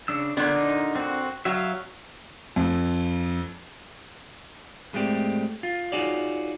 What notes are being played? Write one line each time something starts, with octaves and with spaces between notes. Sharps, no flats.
C#3 D4 E6
A#2 D3 B3
D#4
C4 F#4
F#3 E5 F5
F2
A2 G#3 A3 C4 G4 D5
F4
D#4 F4 F#4 G#4 C#5 D5